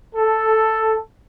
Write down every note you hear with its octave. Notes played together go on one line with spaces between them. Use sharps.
A4